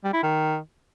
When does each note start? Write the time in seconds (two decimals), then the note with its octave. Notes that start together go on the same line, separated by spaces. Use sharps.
0.04 G3
0.13 E4
0.23 D#3